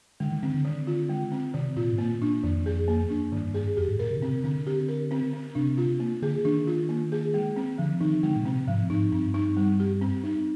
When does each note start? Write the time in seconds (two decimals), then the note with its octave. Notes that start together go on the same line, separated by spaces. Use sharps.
0.20 D3 G#3
0.32 D#3
0.43 D3 C4
0.54 D3
0.65 D#3
0.87 F4
1.09 G#3
1.32 C4
1.54 C3 D#3
1.76 A#2 F4
1.92 G#2
1.98 A#2 A#3
2.22 D4
2.43 F2 D#3
2.66 G#4
2.88 A#3
3.10 D4
3.32 G2 D#3
3.54 G#4
3.77 F2 G4
3.88 G#2
3.99 A#2 A#4
4.10 C3
4.17 D3
4.22 C3 C4
4.44 D3 C4
4.67 G4
4.88 A#4
5.11 C4
5.33 C4
5.55 C3 D4
5.78 F4
6.00 A#3
6.22 D3 G#4
6.45 D#3 D4
6.67 F4
6.89 A#3
7.12 G#4
7.34 G#3
7.56 C4
7.78 D3 F3
8.01 D#3 D#4
8.23 D3 G#3
8.36 A#2
8.45 C3 C4
8.67 G#2 F3
8.90 G#2 D#4
9.12 G2 C4
9.34 D#4
9.57 G3
9.80 G4
10.01 C4
10.24 D#4